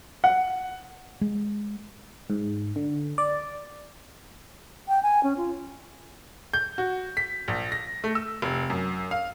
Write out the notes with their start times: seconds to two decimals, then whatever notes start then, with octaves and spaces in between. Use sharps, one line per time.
0.24 F#5
1.21 G#3
2.30 G#2
2.76 D3
3.18 D5
4.88 G5
5.03 G#5
5.23 C#4
5.37 F4
6.53 G6
6.78 F#4
7.17 B6
7.48 A#1
7.72 A#6
8.04 A3
8.15 E6
8.42 F1
8.70 F#2
9.11 F5